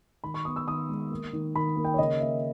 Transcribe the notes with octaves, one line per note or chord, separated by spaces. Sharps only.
D#3 B5
C#6
B3 D#6
E6
D#3 D#6
G#3
A#3
D#3
D#3 B5
A#3
G5
C#5
C#3 D#5
A#3 E5